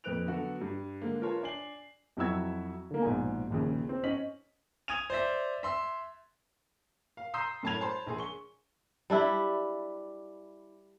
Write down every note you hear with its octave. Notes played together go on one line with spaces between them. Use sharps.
F2 A#2 B4 F#6 D7 F7
D3 F#3 B3 F#4 A4
G2
D3 G#3 A#3
F4 A#4 B4 C#5 A5 C6
D4 D5 G#5 C7 F#7
F2 F#3 E4 F#4 E6 G#6
D3 A#3
A#1 G#2 B2 G#5
A#1 D#2 C#3
C4
C#4 D#5 B6 F#7
D#6 G#6 D#7 F7
C5 D5 E5
E5 C6 E6
F5
A#5 C6 D#6 E6 G6 C7
F#2 A2 A5 B5 G#6 F7
C5 A5 B5 C6
A#1 G#4 C6
C#6 G7
G3 D4 E4